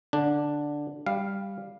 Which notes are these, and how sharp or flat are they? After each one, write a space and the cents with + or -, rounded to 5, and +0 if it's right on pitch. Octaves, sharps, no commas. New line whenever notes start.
D3 +0 D4 +0
G3 +5 F5 +0